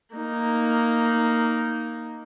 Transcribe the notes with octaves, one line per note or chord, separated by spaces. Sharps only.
A#3 D#4